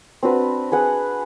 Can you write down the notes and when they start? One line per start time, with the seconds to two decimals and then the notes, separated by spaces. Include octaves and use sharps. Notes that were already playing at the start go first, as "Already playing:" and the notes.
0.23 C4 D4 F#4 B4
0.72 G#4 B4 F#5